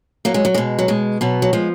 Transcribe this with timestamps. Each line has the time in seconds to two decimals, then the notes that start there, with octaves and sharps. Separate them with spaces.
0.25 F#3 A#3
0.34 G#3
0.45 F#3
0.54 B2 G#3
0.79 F#3
0.88 B2 G#3
1.21 B2 F#3 B3
1.42 F#3
1.53 F3 G#3